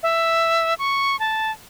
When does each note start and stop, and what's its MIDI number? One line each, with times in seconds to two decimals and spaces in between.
0.03 0.74 76
0.79 1.19 85
1.20 1.51 81